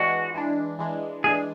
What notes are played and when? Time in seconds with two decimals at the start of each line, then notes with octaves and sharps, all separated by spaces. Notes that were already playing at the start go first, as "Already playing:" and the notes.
Already playing: E3 G#3 D4 F#4
0.34 E3 G#3 D4
0.79 E3 G#3 D4
1.24 E3 G#3 D4 G#4